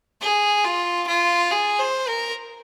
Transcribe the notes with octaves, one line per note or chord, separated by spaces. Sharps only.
G#4
F4
F4
G#4
C5
A#4